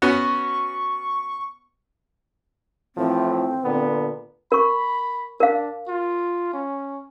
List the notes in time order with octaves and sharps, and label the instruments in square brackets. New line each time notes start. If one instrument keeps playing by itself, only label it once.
[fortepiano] B3 C#4 F#4 [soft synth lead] C#6
[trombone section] A2 E3 F3 [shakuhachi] C4
[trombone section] A#2 D3 B3
[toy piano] A#4 C#6 [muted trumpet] B5
[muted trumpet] D4 [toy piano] A#4 F5
[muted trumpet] F4
C#4